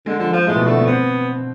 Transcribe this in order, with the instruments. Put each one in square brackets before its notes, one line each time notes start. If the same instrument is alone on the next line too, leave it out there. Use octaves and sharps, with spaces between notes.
[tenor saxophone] D3 [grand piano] G#3
[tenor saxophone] D3 [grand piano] F3
[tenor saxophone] F3 [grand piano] G#3
[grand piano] A2 A3 [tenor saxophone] G#3
[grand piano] B2 B3
[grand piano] D3 D4 [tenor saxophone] A3
[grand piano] B3 B4
[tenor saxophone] B3 [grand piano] C4 C5